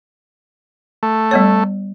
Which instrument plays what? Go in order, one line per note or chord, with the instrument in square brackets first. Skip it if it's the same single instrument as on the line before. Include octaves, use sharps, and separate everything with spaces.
[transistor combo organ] A3
[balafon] G3 B3 C#5